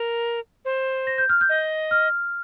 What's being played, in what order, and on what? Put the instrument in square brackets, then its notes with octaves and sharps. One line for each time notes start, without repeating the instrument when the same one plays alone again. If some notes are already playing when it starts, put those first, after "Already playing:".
Already playing: [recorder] A#4
C5
[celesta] A#6
G6
F6
G6
[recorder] D#5
[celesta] F6